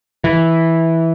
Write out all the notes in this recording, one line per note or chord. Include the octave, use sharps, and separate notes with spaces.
E3